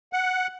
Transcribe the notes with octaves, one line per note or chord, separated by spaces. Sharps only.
F#5